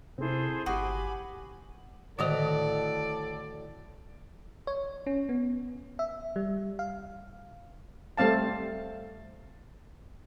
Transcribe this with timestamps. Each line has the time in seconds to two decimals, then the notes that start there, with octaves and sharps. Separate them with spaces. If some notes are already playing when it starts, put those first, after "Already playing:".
0.18 C3 C4 E4 G#4 A4 C5
0.66 G1 F#4 G4 G#5 B5 D6 D#6
2.19 A2 D3 D#3 F#4 A4 C5 D5 D#5
4.67 C#5
5.06 C#4
5.29 B3
5.99 E5
6.36 G3
6.79 F5
8.17 G3 A3 C4 F5 A5